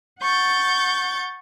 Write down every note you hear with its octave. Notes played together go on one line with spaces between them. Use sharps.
F#5 C#6 G6 A6